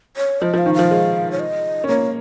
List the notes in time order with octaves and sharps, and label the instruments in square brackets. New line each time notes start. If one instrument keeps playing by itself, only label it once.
[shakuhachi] C#5
[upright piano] F3 [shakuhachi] D#5
[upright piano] F3 [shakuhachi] F5
[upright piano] D#3
[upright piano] F3 [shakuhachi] F5
[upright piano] G#3
[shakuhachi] C#5
D#5
[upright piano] C#4
[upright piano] A#3 [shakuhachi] C#5